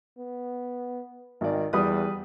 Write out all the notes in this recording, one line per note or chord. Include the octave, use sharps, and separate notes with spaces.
B3
G#1 D#3 D5
E2 G3 B4 D#6